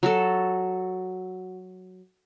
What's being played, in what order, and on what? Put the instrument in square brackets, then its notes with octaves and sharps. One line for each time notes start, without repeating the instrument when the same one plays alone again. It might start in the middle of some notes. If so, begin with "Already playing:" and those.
[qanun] F#3 F#4 A4